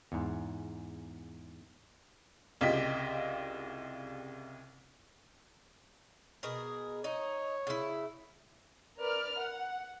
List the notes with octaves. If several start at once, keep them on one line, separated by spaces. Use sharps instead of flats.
E2 G#2
C2 C#3 F4 G4 D#5 B6
B2 G#4 A#4
D#4 C#5
C#3 E4
A#4 B4 D5 F6
F#5